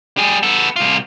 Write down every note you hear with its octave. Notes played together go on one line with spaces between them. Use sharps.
G3 G#4
B3 A4
C2 F4